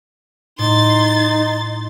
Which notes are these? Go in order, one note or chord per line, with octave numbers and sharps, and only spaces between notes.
A2 D#4 C6 A6